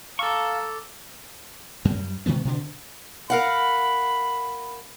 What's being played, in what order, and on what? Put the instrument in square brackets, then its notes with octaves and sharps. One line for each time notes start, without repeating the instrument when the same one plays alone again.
[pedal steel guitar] A4 C#6 [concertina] F5 [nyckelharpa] A5 A#5 [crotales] D6 E6 A6
[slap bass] F#2 G3
B2 D#3 G#3 B3
B2 D3 D4
[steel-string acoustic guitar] A#4 F5 F#5 [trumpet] B5